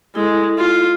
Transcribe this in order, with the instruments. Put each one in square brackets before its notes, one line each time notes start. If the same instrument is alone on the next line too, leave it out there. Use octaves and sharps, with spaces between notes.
[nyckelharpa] G#3 [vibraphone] E4 A4
[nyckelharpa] F4